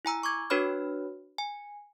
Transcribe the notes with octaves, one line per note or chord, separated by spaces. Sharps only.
E4 G#5 A#5 E6
C#6 D6 G#6
D4 F#4 B4 C#5 B5 F6
G#5